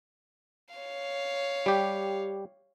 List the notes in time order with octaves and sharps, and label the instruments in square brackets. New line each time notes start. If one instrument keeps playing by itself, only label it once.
[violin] C#5 F5
[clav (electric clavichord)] G3 G4